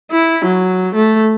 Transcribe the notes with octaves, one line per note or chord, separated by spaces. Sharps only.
E4
F#3
A3